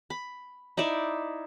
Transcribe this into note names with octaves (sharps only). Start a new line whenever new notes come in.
B5
D#4 E4 D5 E5